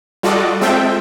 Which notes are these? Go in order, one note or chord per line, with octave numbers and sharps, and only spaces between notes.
G3 F4 F#4 A4 D5 D#5
G#3 C4 F4 A4 E5 G5